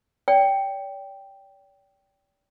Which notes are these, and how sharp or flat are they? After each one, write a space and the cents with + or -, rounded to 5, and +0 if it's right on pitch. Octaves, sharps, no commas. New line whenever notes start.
D5 -45 G5 +0